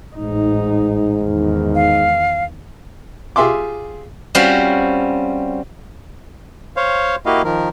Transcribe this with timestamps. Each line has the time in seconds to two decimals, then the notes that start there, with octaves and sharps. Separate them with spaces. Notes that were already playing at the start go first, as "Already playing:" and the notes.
0.16 A1 G#2 D#4
1.22 E2 D#3
1.75 F5
3.36 F4 G4 G#4 E5 C6 D6
4.35 G3 C4 C#4 F4 F#4
6.77 C5 C#5 F5
7.26 A#3 E4 F#4 G4 D#5 F5
7.44 D#3 F3 A#4